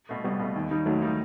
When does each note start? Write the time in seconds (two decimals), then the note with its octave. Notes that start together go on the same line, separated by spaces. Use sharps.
0.09 B2 A3
0.24 C2 G3 B3
0.39 B2 A3
0.56 D#2
0.71 D#3 G3 D#4
0.86 D#2 F#3 A3
1.02 D#3 G3 D#4